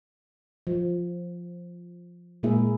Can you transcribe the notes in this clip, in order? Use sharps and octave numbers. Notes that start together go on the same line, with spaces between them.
F3
A#2 G#3 A#3 E4 G#4 E5